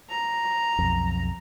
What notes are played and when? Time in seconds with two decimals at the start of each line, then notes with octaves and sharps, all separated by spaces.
0.10 A#5
0.79 B1 F2